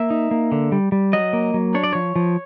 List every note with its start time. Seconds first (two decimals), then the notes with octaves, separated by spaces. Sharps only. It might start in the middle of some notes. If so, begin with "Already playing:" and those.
Already playing: A#3 E5
0.10 D#4
0.31 A#3
0.52 D3
0.72 G3
0.92 G3
1.13 F#3 D#5
1.33 A#3
1.54 F#3
1.75 D4 C#5
1.83 D5
1.93 F3 C#5
2.16 F3